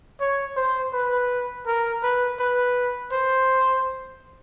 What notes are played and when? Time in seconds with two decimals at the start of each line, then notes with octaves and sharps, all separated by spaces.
0.21 C#5
0.56 C5
0.93 B4
1.67 A#4
2.03 B4
2.39 B4
3.12 C5